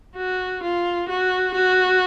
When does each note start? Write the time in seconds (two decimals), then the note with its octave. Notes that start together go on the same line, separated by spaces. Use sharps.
0.17 F#4
0.63 F4
1.09 F#4
1.56 F#4